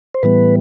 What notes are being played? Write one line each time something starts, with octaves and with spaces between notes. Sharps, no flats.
C5
A2 E3 G3 B3 B4